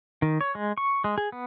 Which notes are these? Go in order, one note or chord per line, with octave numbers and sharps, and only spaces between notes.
D#3
C#5
G#3
C#6
G#3
G#4
B3